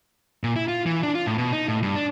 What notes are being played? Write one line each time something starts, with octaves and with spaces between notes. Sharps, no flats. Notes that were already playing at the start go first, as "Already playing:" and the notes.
A#2
E4
F4
E3
D4
F4
A2
B2
D#4
A2
G2
D4